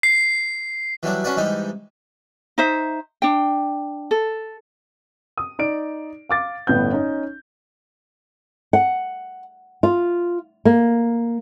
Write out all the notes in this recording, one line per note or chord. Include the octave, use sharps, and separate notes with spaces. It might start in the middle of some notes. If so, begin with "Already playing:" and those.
C7
E3 F#3 G3 D4
C#4 D4 F#4 B4 D5
G#2 E3 G3 D#4
D#4 C5 E5
D4 G5
A4
D#6
D#4 D5 D7
F5 D6 A6
G1 A2 B3 C#4 G6
C#4 D#4
F#5
F4
A#3